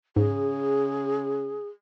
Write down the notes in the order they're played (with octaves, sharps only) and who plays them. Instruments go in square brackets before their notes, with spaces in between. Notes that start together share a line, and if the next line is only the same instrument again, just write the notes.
[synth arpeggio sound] G#2 [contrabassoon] C#3 [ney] G#4